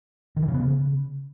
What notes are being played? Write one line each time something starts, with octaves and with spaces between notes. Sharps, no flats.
D#3
E3
C#3
B3
C#3